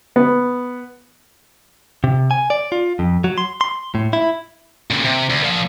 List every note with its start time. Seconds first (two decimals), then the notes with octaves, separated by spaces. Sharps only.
0.16 B3
2.04 C3
2.31 G#5
2.50 D5
2.72 F4
2.99 F2
3.24 F#3
3.38 C6
3.61 C6
3.95 A2
4.13 E4
4.90 A#2 C#3
5.05 C3
5.30 D2
5.43 A#2 F3